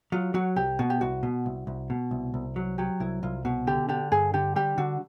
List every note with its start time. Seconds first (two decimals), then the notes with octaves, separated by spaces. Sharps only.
0.12 F#3 F4
0.34 F#3 F#4
0.56 C2 G4
0.79 B2 F#4
0.90 G4
1.01 C2 F#4
1.23 B2
1.46 C2
1.67 C2
1.90 B2
2.11 C2
2.34 C2
2.56 F#3
2.78 F#3 G4
3.00 C2 E4
3.23 C2 F4
3.45 B2 F#4
3.67 D3 G4
3.89 D3 G4
4.12 G2 G#4
4.34 D3 G4
4.56 G3 G4
4.78 D3 F#4